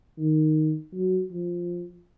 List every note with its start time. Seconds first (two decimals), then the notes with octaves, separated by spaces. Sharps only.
0.18 D#3
0.93 F#3
1.31 F3